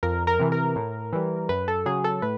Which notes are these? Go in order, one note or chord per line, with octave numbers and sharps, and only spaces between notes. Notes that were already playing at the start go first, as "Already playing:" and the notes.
F2 A#4
A#4
C3 E3
A#4
A2
E3 G3
F#2 B4
A4
C#3 F#3 G#4
A4
A2 B4